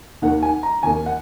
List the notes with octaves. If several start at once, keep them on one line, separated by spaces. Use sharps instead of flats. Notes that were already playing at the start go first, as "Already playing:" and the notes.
D#2 D#3 A#3 F#5
G#5
A#5
D#2 D#3 A#3 G#5
F#5